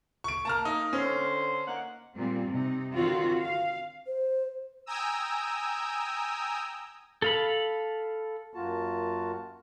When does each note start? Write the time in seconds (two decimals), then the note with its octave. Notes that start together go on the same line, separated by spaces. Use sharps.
0.24 C#6 D7
0.45 A#3 A5 A#5 F6
0.65 D#4
0.93 D3 C#4 C5
1.66 A#3 D#4 F#5
2.16 A#2 G3 C4
2.50 C3 D#4
2.94 D3 D#3 C4 F4 F#4
3.41 F5
4.07 C5
4.86 G5 G#5 A#5 D#6 E6
7.22 A4 F5 B5
8.54 F#2 A#3 F4 F#4 A5